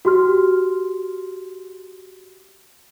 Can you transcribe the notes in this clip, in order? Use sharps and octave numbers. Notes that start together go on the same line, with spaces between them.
F#4 G4 C6 F6